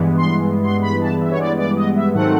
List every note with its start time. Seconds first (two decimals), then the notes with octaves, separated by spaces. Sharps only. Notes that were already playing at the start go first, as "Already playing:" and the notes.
Already playing: G2 E3 G#3 B3
0.17 C6
0.63 C6
0.82 B5
1.01 A5
1.21 E5
1.31 C#5
1.39 D5
1.58 D5
1.76 D#5
1.96 E5
2.14 G#2 D#3 F#3 A3 C4 F#5